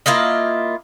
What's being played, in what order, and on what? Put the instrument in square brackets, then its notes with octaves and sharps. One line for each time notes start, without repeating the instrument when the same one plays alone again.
[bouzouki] A#3 E4 F4 D#5